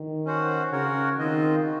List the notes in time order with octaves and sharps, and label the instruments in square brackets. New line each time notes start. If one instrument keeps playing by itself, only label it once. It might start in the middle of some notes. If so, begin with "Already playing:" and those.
Already playing: [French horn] D#3
[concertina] C#4 F#4 C5 F#5
[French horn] C#3 [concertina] F#4 A#4 C#5 F#5
[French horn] D#3 [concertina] C4 F4 C5 D#5
[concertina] F#4